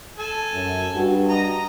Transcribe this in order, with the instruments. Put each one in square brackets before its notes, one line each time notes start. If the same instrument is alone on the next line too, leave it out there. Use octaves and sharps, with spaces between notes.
[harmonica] A4 G#5
[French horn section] F#2
G2 F#4
[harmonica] D#5 A#5